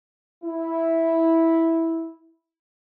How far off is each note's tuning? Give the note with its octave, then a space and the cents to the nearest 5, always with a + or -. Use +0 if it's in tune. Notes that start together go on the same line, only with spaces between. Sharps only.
E4 -5